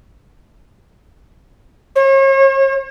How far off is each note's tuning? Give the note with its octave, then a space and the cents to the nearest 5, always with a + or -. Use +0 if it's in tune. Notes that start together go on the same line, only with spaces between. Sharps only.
C#5 -40